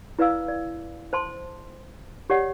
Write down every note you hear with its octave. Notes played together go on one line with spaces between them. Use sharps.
E4 B4 D5 F5 E6
D5
C5 A5 C6
G4 C#5 D5 F#5